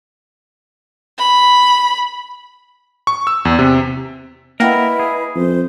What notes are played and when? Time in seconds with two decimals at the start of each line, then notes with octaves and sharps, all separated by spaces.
1.18 B5
3.07 C#6
3.27 E6
3.45 E2
3.59 C3
4.60 A#3 E4 A#4 B4 D#5 F#5 G5
4.99 G#4
5.35 F2 C5